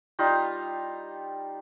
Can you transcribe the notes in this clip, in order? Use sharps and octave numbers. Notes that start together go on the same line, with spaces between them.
G3 D#4 F4